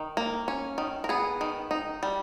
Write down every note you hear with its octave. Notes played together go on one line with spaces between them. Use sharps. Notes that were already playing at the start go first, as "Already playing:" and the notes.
Already playing: D#3
A#3
C#4
D#3
A#4
B3 G#4
D#3
D#4
G3